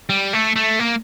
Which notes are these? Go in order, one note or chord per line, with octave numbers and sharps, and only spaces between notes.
G3
A3
A3
A#3